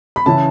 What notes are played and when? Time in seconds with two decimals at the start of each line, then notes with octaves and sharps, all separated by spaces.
0.16 B5
0.26 C#3 E3 C#4 E4 A5